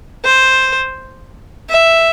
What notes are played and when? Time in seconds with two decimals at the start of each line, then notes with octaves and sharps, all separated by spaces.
0.25 C5
1.69 E5